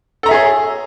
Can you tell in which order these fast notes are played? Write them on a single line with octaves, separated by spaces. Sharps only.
A4 A#5 E5 G#4 C#5